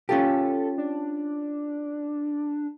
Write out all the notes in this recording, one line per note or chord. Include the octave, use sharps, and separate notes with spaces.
C#4 F4 G4 A4
D4